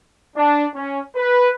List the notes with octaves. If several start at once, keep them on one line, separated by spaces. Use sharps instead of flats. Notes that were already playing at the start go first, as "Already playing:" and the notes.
D4
C#4
B4